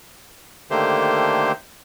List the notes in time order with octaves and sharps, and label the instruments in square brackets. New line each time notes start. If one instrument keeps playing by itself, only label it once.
[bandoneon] D3 D#3 A3 A#3 G4 C5